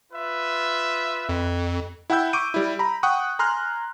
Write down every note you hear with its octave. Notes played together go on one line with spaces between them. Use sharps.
F4 B4 E5
F2
E4 F#5 G5 B5 E6 G6
C#6 D6 G6 D7 D#7
G3 E4
A#5 B5
F#5 G5 C#6 D#6 F#6
G#5 A#5 C6 F6 F#6